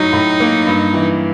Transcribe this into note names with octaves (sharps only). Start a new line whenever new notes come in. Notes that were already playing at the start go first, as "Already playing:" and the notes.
Already playing: A2 F#3 D#4
A2
A#3
G2
E3